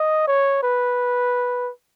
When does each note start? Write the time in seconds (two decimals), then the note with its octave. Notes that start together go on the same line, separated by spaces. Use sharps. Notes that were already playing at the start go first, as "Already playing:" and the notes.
Already playing: D#5
0.27 C#5
0.63 B4